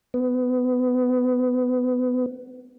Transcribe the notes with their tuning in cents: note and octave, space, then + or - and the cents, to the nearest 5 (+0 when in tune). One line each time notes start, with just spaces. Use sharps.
B3 +25